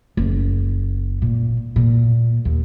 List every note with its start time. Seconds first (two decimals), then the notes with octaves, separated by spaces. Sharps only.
0.17 F#1
1.22 A#2
1.76 A#2
2.45 D#2